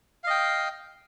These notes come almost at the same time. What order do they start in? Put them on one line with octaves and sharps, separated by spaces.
F5 D#5 G5